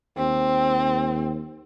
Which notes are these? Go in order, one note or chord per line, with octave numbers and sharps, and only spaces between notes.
D#2 C4